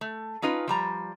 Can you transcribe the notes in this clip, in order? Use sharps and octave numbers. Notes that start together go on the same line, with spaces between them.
A3
C#4 D#4 F4 B4
F3 G3 A#5